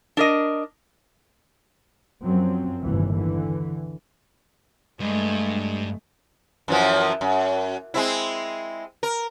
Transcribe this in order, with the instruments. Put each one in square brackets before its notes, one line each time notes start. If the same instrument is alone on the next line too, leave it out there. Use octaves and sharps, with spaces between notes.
[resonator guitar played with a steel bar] D4 A#4 D#5
[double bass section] F#2 F3 F#3 C4
G1 D#2 A2 C3 E3
D3 E3
[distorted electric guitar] G2 [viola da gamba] G#3 A3
[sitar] F#2 E3 F3
F#2
G#3 C4 E4
A#4